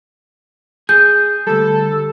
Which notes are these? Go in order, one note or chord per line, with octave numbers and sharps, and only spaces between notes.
G#4 G6
D2 G3 A4